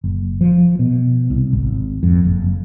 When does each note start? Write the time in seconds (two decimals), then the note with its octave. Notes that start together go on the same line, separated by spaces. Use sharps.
0.04 F#1
0.41 F3
0.79 B2
1.30 C2
1.53 G#1
2.03 F2
2.25 F#1